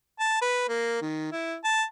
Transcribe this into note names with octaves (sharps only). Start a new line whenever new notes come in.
A5
B4
A#3
D#3
E4
A5